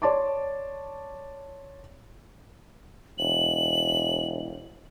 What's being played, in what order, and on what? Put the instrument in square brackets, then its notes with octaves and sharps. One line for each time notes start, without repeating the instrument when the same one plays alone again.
[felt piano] C#5 D5 A5 C6 D6
[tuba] E1 [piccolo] F#7